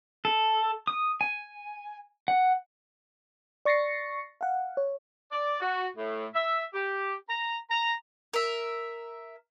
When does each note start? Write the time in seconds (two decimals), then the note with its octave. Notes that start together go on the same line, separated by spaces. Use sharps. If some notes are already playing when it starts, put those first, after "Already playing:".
0.25 A4
0.87 D#6
1.21 G#5
2.28 F#5
3.65 D5 C#6 A6 A#6 C7 C#7
4.41 F5 F#5
4.77 C#5
5.32 D5
5.61 F#4
5.96 A2
6.33 E5
6.73 G4
7.29 A#5
7.69 A#5
8.34 A#4 E5